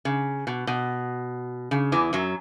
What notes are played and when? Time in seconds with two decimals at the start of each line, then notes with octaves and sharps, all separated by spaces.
0.05 C#3
0.47 B2
0.67 B2
1.71 C#3
1.92 E2 E3
2.13 F#2 F#3